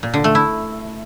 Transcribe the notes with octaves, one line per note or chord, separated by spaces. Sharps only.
A#2
D3
A3
E4